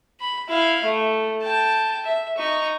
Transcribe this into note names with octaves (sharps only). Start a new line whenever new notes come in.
B5
E4 F5
A3
G5 A5
E5
D#4 C#6